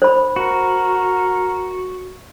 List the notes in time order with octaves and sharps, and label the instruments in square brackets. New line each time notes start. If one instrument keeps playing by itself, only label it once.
[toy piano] C5 B5
[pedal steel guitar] F#4 [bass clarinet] A#4